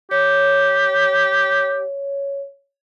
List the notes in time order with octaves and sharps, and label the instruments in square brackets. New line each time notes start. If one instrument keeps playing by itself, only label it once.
[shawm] G4 [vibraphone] C#5